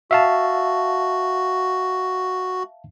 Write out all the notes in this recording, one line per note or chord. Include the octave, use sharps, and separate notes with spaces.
F#4 E5 F5 A5